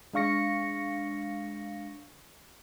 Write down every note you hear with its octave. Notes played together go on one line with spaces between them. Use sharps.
G#3 D4 F5 C#6 A#6 C#7